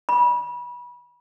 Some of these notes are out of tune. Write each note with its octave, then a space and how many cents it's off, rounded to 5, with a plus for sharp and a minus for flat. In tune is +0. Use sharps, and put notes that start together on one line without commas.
B5 -30